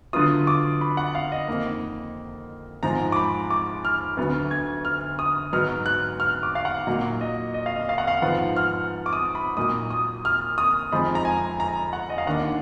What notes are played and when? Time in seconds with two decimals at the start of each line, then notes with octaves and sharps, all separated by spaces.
0.13 D3 F#3 B3 F4 D#6
0.47 D6
0.81 B5
0.97 F#5
1.15 F5
1.32 D#5
1.48 F2 D#3 A#3
2.83 G#2 F3 G#3 A#5
3.12 D6
3.16 B5
3.50 D6
3.85 F6
4.17 D2 D3 F#3 B3
4.51 G#6
4.85 F6
5.19 D#6
5.53 G#2 F#3 B3 D#4 F6
5.86 F#6
6.20 F6
6.43 D6
6.55 F5
6.65 F#5
6.87 A#2 F#3 A#3 D#4 F5
7.21 D#5
7.54 D#5
7.66 F5
7.76 D#5
7.89 F5
7.98 F#5
8.07 F5
8.22 G#2 F3 B3 F#5
8.56 F6
9.06 D6
9.13 D#6
9.35 B5
9.57 A#2 F#3 A#3 D#4 D#6
9.91 D#6
10.25 F6
10.58 D#6
10.92 F2 F3 G#3 D#4 B5
11.15 A#5
11.25 G#5
11.60 A#5
11.93 F#5
12.10 D#5
12.18 F5
12.26 D#2 D#3 A#3 D4 F#5